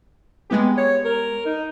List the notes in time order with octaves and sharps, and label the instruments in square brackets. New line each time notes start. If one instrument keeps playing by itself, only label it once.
[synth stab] G#3 B3 G4
[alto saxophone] C#5
A#4
D#4